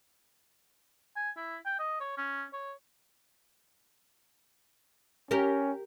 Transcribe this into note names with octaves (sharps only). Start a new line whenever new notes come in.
G#5
E4
G5
D#5
C#5
C#4
C#5
C#4 G4 A#4